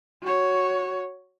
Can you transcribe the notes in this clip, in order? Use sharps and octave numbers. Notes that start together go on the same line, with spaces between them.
F#4 C#5